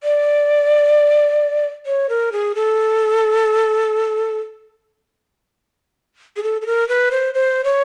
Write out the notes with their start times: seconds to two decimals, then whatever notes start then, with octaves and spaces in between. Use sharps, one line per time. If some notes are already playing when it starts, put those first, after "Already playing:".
0.03 D5
1.86 C#5
2.09 A#4
2.32 G#4
2.55 A4
6.37 G#4
6.43 A4
6.61 A4
6.66 A#4
6.89 B4
7.11 C5
7.34 C5
7.64 C#5